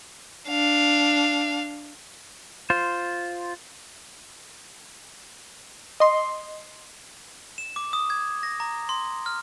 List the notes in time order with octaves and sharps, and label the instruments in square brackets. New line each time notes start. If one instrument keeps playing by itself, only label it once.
[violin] D4 F5
[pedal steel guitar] F4 C5
[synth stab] D#5 C6
[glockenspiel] E7
D6
D#6
G#6
A#6
A#5
C6
F6